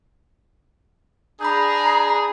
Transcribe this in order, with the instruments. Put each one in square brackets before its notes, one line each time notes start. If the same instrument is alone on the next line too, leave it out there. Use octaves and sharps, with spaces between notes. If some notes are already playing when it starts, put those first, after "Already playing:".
[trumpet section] D4 G#4 [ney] A#5 [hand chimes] B5 D#6 G6